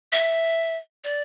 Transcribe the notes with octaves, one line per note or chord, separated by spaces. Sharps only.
E5
D5